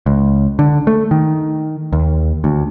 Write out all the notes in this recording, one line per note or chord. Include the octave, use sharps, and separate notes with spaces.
C#2
D3
A3
D#3
D#2
D2